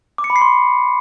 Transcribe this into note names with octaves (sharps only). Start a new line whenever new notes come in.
D6
C#7
B5
C7
C6